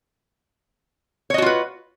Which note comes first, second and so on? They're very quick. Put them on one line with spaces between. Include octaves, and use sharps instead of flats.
C#5 D#5 F#4 F4 B4